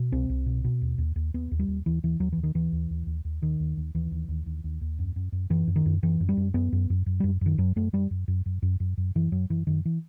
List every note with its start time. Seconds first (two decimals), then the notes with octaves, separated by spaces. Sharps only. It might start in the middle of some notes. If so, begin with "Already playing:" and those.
Already playing: B2
0.12 C2 C4
0.29 C2
0.46 B2
0.64 B2
0.82 D#2
0.98 D#2
1.16 D#2
1.34 D#2 B3
1.51 D#2
1.59 G3
1.68 D#2
1.86 D#2 E3
2.03 D#2 E3
2.20 D#2 F#3
2.33 D#2 E3
2.43 D#3
2.54 D#2 E3
2.72 D#2
2.90 D#2
3.07 D#2
3.25 D#2
3.42 D#2 D#3
3.60 D#2
3.77 D#2
3.95 D#2 E3
4.11 D#2
4.28 D#2
4.46 D#2
4.64 D#2
4.81 D#2
4.99 F#2
5.16 F#2
5.32 F#2
5.50 F#2 E3
5.67 F#2
5.76 D#3
5.86 F#2
6.03 F#2 E3
6.20 F#2
6.29 G3
6.37 F#2
6.54 F#2 B3
6.72 F#2
6.90 F#2
7.06 F#2
7.20 F#2 G3
7.41 F#2 D#3
7.58 F#2 F#3
7.76 F#2 A3
7.93 F#2 G3
8.11 F#2
8.28 F#2
8.46 F#2
8.62 F#2
8.80 F#2
8.97 F#2
9.15 F#2 E3
9.32 F#2 F#3
9.50 F#2 E3
9.67 F#2 D#3
9.85 E3